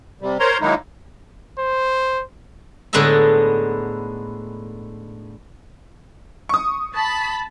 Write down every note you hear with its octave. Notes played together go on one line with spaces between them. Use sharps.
C3 G3
A#4 C5 C#5 A#5 C6
D#3 F#3 G#3 A#3 D#4 E4
C5
A2 D3 G#3 B3 D#4 E5
C#6 D#6
A5 B5